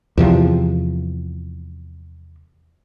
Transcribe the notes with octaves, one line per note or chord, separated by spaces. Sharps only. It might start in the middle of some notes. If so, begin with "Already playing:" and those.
E2 C3 F3